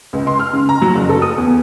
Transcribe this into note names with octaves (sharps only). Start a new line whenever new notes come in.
C#2
C6
F6
C#3
A#5
F#3
F#1
A4
D#6
E2